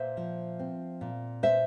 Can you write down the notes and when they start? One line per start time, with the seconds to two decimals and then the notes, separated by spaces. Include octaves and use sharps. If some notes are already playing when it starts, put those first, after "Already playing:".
Already playing: A#2 C5 E5
0.17 F3
0.59 C4
1.01 A#2
1.43 C5 E5